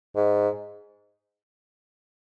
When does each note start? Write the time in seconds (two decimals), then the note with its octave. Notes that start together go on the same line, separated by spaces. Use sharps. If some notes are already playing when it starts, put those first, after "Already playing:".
0.15 G#2